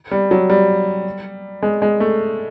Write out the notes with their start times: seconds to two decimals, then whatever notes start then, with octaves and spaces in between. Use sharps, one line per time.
0.11 G3
0.31 F#3
0.50 G3
1.62 G#3
1.82 G#3
2.00 A3